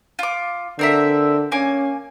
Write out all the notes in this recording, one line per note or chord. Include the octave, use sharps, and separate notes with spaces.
F4 D6
D3 C4 A#4 E5
A#3 C#4 G#5 D6